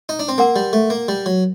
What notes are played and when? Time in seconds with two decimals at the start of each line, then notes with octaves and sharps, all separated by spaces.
0.09 D#4
0.19 D4
0.29 C4
0.38 A#3 A#4 F#5 C6
0.56 G3
0.73 A3
0.90 A#3
1.08 G3
1.26 F#3